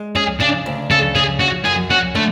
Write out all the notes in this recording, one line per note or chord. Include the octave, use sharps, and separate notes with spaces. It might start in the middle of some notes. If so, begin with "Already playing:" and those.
Already playing: G#3
C#4 G#4
C#3 D4
D2
C#3 A4
C#4 G#4
C#4 F#4
F#2 G#4
C#4 F#4
D3 A3